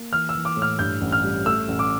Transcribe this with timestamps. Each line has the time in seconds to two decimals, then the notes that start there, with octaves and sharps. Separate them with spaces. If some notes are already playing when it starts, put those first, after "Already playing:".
Already playing: A#3
0.12 E3 F6
0.29 E6
0.35 E3
0.45 D6
0.57 A2
0.62 F6
0.79 G2 G6
1.01 A1
1.12 F6
1.24 G3
1.46 A3 E6
1.68 A1
1.79 D6